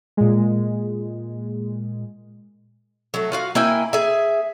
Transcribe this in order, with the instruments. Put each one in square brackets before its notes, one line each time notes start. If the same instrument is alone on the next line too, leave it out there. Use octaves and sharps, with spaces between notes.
[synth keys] A#2 G#3
[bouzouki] F#3 A3
F4 F#4 F5
A#3 E4 G5 G#5
G#4 E5